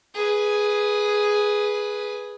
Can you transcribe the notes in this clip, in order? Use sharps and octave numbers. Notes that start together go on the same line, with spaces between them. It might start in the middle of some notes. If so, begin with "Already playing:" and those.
G#4 B4